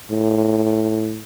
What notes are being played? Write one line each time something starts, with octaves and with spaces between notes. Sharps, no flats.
A2